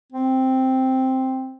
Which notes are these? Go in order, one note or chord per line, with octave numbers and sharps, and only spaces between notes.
C4